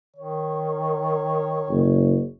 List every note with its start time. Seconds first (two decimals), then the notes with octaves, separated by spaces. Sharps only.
0.16 D#3 C#5
1.69 F#1